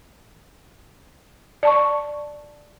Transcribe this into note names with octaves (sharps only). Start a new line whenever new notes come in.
D5 A5 C#6